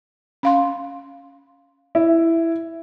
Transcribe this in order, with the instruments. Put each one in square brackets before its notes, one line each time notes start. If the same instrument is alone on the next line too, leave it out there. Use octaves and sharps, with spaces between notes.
[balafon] C#4 F5 C6
[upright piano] E4